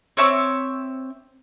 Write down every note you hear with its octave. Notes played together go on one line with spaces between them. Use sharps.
C4 C#5 E5 D6